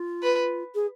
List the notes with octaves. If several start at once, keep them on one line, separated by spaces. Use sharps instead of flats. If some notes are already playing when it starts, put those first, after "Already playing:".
Already playing: F4
B4
G#4